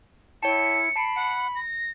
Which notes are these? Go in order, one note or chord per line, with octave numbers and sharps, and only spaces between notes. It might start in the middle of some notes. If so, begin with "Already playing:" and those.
E4 C#5 G5 A5 C#7
A5 B5 C7 D7
F#5 C#7
A#6